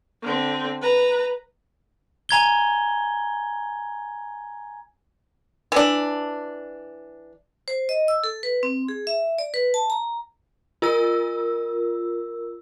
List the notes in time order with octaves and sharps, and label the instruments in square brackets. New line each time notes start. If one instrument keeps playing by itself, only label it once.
[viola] D3 C4
B4 A#5
[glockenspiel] G#5 A#5 G#6 G7
[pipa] E3 D4
[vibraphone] C5
D#5
E6
A4
B4
C4
G#4
E5
D5
B4
A5
A#5
[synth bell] F4 A#4 E6